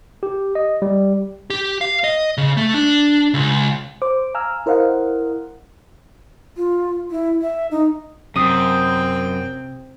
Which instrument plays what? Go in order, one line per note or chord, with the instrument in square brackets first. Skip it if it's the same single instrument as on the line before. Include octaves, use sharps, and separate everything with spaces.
[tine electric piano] G4
D#5
G3
[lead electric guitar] G4
F5
D#5
C#3
A3
D4
C#2
[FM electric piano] C5 D6
F5 G#5 A#5 E6 F6
E4 A#4 C5 D#5 F5 F#5
[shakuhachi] F4
E4
E5
D#4
[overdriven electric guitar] F#2 [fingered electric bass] C3 [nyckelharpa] C4 G5 [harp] D#6